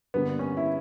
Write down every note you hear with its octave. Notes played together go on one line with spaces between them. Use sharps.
G2 D3 G3 A#3 B3
C#4
E4